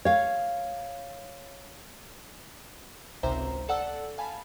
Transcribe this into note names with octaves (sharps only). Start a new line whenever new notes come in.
C#5 F5
G#1 C#2 C3 C5 E5 A#5
A4 D5 F#5 A5 E6
F5 G#5 A5 B5